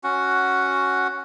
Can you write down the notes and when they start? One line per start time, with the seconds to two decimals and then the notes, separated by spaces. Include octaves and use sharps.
0.04 C#4 F#4 F#5